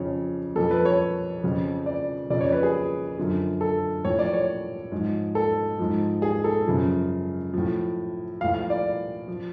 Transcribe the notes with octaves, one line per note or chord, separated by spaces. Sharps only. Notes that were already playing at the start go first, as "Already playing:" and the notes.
Already playing: F2 C#3 F3 C#5
F2 F3 A4
B4
C#5
F2 C#3 F3
D5
F2 C#3 F3 D5
C#5
B4
G#4
F#2 D3 F3
A4
A2 F3 C#5
D5
C#5
G#2 F3
A4
G#2 F3
G#4
A4
F#2 C#3 F3
A2 F3
A2 F3 F5
F5
D5
F3